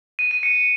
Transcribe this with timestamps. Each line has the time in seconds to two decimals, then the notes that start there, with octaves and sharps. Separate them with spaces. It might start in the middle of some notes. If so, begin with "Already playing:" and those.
0.19 D#7
0.31 D#7
0.43 C#7